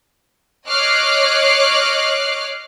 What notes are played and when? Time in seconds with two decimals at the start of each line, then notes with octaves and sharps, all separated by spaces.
0.68 C#5 D#5 D6 F6 F#6 C7